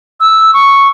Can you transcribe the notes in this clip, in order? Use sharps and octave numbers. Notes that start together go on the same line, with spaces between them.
E6
C#6